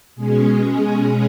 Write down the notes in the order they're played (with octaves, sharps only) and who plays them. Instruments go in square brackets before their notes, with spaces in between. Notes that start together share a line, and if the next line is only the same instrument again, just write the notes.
[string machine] B2 G#3 C#4 G#4